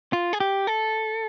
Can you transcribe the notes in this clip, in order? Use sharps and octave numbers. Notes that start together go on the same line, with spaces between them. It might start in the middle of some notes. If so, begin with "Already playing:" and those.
F4
G#4
G4
A4